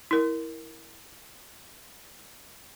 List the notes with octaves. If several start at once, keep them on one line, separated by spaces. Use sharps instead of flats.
E4 A#4